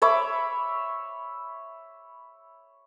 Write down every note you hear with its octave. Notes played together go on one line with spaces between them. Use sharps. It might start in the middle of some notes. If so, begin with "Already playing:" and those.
C#5 E5 B5 D6